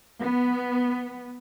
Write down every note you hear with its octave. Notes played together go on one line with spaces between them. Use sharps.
B3